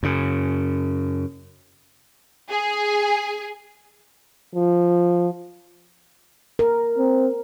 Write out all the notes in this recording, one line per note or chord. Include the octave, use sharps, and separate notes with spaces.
F#2 C#3
G#4
F3
A#4
C4